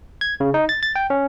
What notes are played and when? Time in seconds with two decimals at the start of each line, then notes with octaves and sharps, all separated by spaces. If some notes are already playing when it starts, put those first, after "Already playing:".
0.21 G#6
0.40 C#3
0.54 D#4
0.69 A6
0.83 A6
0.96 G5
1.10 C#4